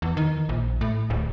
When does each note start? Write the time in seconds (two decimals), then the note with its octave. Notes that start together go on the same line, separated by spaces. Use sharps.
0.02 E2
0.17 D#3
0.49 A#1
0.81 A2
1.10 D1